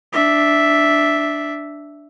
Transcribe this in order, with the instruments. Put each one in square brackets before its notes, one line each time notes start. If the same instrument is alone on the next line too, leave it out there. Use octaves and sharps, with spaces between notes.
[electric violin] D4 E5